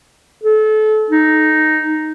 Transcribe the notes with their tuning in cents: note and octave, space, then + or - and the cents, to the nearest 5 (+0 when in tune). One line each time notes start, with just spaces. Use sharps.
A4 -30
D#4 -5